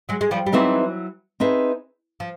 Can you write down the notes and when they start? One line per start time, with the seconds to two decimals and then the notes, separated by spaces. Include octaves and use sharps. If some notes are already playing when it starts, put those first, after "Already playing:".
0.09 F#3 G#3
0.21 G#3
0.31 F3 G3
0.46 G3
0.52 E3 F#3 C4 D#4 G#4 B4 E5
1.40 C4 D#4 G#4 B4 E5
2.20 F3